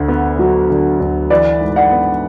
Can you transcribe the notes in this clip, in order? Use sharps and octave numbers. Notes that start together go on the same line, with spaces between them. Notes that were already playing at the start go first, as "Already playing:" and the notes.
Already playing: D2 D3
B3
F#3
D3
D2
E3 B4 D5
G#2
D5 F#5
B3